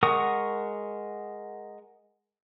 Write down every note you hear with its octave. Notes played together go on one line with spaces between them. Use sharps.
G#3 A#4 F#5 C#6 D#6